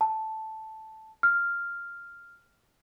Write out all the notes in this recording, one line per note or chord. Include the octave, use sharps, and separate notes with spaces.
A5
F6